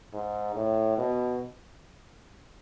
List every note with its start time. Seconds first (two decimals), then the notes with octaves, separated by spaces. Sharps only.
0.14 G#2
0.56 A2
0.98 B2